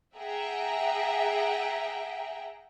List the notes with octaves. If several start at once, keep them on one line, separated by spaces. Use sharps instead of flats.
G#4 E5 F#5 G5 A#5